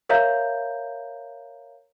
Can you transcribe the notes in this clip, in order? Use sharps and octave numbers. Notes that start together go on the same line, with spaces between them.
A#4 C#5 E5 F5 A#5 G6